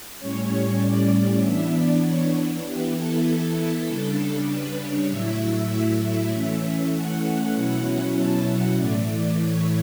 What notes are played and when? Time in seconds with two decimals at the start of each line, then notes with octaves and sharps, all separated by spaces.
0.19 A2 G3 C#4 C#5
0.81 D5
1.42 E3 B3 D4 E5
1.73 D5
2.03 C#5
2.64 E3 B3 E4 G4
2.95 A4
3.25 A4
3.87 C#3 G3 D4
4.48 B4
4.78 C#5
5.09 A2 F#3 A3 E4 E5
6.32 E3 A3 C#4 E5
6.93 F#5
7.55 B2 F#3 C#4 E4
8.16 A5
8.46 F#5
8.77 A2 E3 A3 D5
9.38 C#5